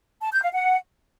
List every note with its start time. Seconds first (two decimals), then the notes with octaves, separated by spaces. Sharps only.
0.22 A5
0.32 G6
0.42 F5
0.53 F#5